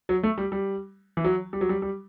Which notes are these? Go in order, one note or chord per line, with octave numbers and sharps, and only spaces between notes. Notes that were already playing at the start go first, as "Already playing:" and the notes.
F#3
A3
G3
G3
E3
F#3
G3
F#3
G3
G3